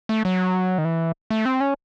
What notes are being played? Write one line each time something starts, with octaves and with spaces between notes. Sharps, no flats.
A3
F#3
D#3
E3
A3
C4
C#4